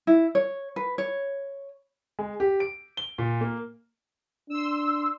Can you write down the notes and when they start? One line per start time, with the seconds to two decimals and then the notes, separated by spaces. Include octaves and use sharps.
0.07 E4
0.35 C#5
0.76 B4
0.98 C#5
2.19 G#3
2.40 G4
2.60 D7
2.97 G7
3.18 A#2
3.41 A#3
4.50 D4 C6 E6